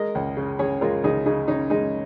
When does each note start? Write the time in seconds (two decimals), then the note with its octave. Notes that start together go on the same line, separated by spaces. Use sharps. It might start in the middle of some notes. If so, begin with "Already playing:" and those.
Already playing: G#3 A#4 D#5
0.15 C#2
0.37 C#3
0.59 C#4 G#4 C#5
0.81 G#3 F4 A#4
1.03 C#2 D#4 G#4
1.26 C#3 D#4 G#4
1.48 C#4 D#4
1.70 G#3 D#4 G#4